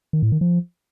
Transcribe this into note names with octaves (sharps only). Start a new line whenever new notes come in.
D#3
A2
D#3
F3